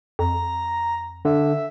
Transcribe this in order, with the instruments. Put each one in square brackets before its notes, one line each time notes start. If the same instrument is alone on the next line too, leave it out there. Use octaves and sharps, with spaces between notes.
[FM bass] F2 [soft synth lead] A#5
[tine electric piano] D3 [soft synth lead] E5